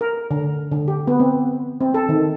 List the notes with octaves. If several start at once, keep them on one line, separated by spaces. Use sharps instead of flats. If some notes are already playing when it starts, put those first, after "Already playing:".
A#4
D3
D3
G4
B3
C4
C4
A4
D#3